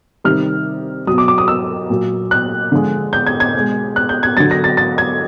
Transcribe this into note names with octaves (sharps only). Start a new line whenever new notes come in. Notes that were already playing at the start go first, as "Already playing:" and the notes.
C3 D#3 G3 F6
B2 F#3 D#6
D6
D6
D#6
E6
A#2 F#3
F#6
D3 F3 G#3
G6
G#6
G#6
B2 G#3
F#6
G6
G#6
D3 F#3 A6
A#6
A6
A6
G#6